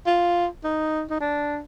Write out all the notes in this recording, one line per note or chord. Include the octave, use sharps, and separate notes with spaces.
F4
D#4
D#4
D4